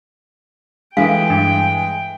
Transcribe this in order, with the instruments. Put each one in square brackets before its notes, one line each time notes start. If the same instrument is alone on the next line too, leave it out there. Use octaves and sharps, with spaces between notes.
[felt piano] E3 G#3 [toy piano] A4 F5 [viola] G5
[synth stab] G2